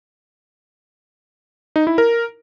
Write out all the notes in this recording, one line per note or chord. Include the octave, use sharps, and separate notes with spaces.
D#4
E4
A#4